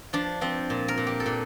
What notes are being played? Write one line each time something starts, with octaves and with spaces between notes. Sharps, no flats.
F3 D4
F3 C4
A#2
A#4
A#2
G4
A4
A#2